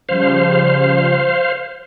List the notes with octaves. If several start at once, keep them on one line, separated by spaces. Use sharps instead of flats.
C#3 F3 G3 C5 F5